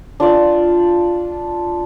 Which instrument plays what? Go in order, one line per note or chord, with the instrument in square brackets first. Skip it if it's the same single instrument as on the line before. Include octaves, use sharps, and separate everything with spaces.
[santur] D4 F4 D5